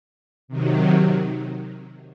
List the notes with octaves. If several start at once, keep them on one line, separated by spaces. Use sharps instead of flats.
C3 D#3 F#3